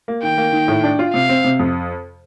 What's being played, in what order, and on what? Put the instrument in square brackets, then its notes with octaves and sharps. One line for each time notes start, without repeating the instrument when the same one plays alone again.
[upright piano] A#3
[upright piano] D#3 [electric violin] G5
[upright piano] A#3
D#3
A2
D4
F4
[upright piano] C3 [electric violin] F5
[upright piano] C4
C3
F2